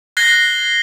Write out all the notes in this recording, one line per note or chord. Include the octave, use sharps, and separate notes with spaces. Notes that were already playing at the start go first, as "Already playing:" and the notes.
F#6 G#6 A#6 C7 G7